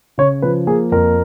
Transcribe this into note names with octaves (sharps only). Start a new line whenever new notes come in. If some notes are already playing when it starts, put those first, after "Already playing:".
C#3 C#5
F3 B4
A#3 G#4
F2 A#4